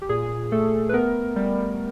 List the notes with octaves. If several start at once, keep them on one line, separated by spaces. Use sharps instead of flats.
G4
A#2 G#4
A3 A4
B4
B3 A#4
G3